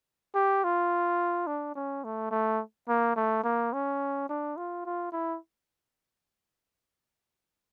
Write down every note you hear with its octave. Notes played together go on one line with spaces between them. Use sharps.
G4
F4
D4
C#4
A3
A3
A#3
A3
A#3
C#4
D4
F4
F4
E4